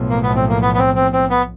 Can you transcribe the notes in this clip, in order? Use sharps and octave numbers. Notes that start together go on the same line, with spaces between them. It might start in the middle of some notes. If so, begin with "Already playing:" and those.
Already playing: B1 A2 F3
A#3
B3
C4
A#3
B3
B3
C4
C4
C4
B3